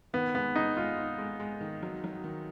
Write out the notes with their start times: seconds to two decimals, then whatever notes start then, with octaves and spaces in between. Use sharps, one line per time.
0.13 D#3 B3
0.34 G#3 B3
0.55 G#3 D#4
0.77 G#3 F4
0.97 D#4
1.18 G#3
1.40 G#3
1.61 D#3
1.83 F#3
2.04 F#3
2.24 D#3